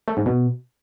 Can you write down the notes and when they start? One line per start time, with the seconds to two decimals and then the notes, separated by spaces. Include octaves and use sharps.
0.08 A3
0.17 G#2
0.26 B2